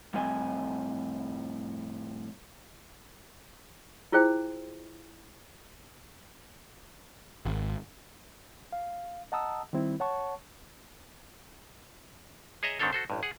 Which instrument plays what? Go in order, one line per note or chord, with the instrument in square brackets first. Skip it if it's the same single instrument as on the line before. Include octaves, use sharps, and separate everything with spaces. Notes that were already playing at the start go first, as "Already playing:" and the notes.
[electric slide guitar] F2 A2 G3 C4 D#5 G#5
[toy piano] E4 F4 G#4 C5 G5
[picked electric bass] G#1
[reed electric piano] F5
D#5 F#5 A5 A#5 D#6 E6
D#3 G3 C4 E4
C#5 F#5 A5 C#6
[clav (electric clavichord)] G#4 C#5 D#5 E5 A#5
G#2 D#3 C4 D4 A4 C#5
F#4 A4 C5
A1 G2
G#4 F#5